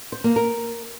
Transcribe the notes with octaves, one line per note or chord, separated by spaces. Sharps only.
C5
A#3
A#4